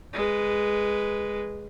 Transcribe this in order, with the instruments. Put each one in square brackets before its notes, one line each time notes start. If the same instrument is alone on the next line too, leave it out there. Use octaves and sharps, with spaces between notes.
[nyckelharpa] G#3 B4